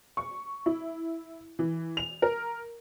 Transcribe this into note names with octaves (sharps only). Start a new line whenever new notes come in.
C#6
E4
E3
F7
A#4